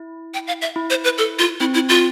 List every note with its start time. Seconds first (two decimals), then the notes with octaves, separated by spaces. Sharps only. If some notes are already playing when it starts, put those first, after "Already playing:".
Already playing: E4
0.34 G5
0.47 F5
0.62 E5
0.76 E4
0.90 C5
1.04 B4
1.18 A4
1.39 F4
1.60 C4 E4
1.74 E4
1.89 F4